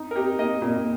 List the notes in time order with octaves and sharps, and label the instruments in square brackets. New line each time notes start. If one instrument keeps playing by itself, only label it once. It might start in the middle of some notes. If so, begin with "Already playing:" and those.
Already playing: [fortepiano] D#4
A#4
D#4 G4
A#3 D#5
A#2